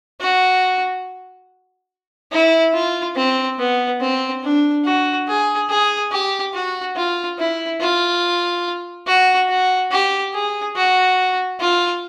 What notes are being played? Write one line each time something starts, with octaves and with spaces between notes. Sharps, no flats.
F#4
E4
F4
C4
B3
C4
D4
F#4
G#4
G#4
G4
F#4
F4
E4
F4
F#4
F#4
G4
G#4
F#4
F4